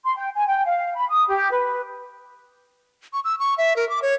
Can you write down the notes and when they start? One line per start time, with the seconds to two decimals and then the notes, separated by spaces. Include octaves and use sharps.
0.04 C6
0.17 G5
0.35 G#5
0.47 G5
0.66 F5
0.96 B5
1.09 D#6
1.28 G4
1.51 B4
3.13 C#6
3.25 E6
3.39 C#6
3.58 E5
3.76 A#4
3.90 D6
4.02 C#5